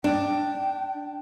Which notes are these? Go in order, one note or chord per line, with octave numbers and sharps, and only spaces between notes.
D4 G5